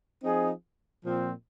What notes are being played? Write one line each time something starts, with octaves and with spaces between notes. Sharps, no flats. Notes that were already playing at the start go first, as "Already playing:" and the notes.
F3 C4 D#4 G#4
A#2 F3 C4